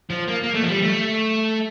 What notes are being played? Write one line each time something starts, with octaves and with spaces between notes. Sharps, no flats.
F3
A#3
A#3
A3
F3
G3
A3